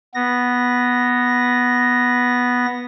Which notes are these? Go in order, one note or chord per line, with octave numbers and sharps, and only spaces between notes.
B3 A#6